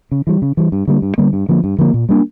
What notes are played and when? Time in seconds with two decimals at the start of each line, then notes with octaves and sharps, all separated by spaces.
0.12 C#3
0.27 E3 G3
0.42 C#3
0.57 E3 G3
0.72 G2
0.88 D3 G3 A#3
1.02 G2
1.18 D3 G3 A#3
1.33 G2
1.49 D3 F3 A#3
1.64 G2
1.78 D3 F3 A#3
1.94 A#2
2.09 G3 A#3 D4